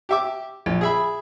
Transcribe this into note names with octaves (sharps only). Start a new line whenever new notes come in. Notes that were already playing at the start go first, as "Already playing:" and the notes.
G4 E5 D6
A#1
G#4 E5 B5